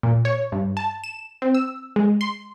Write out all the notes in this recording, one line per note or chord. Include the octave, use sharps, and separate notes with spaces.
A#2
C#5
G2
A5
E7
C4
E6
G#3
C6